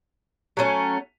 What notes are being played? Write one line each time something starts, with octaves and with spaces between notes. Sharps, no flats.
F#3 A3 C#4